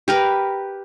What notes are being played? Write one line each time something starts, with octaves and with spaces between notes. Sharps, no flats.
G4 A#4 B4